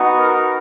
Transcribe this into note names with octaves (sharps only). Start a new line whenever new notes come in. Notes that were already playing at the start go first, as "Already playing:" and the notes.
Already playing: B3 D#4 F#4
A#4